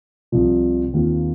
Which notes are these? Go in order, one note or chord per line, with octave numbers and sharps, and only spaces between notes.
C2 C3 F3
D#2 D#3 C4 F4